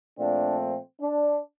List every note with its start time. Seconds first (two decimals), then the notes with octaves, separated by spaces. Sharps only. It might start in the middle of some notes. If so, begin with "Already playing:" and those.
0.19 A#2 F3 A3 C4 D4
1.01 D4